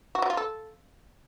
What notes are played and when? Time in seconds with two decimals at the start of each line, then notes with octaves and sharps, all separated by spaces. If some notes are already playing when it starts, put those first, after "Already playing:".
0.15 F#4
0.22 F#3
0.30 F4
0.37 A4